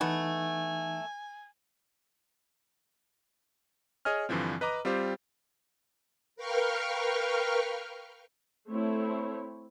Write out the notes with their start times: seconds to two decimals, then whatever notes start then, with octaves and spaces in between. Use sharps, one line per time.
0.01 E3 A3 B3 D#4 G#5
4.05 G#4 C#5 D#5 G#5 F6
4.29 G2 D3 E3 F3 C4
4.61 B4 D#5 A#5 D6
4.85 G3 C4 F4 G4 C5
6.36 A#4 B4 F5 G5 C#6 F6
8.71 A3 C4 E4 C#5